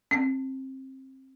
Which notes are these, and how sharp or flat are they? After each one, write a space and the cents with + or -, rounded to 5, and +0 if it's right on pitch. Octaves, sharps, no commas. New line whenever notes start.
C4 +25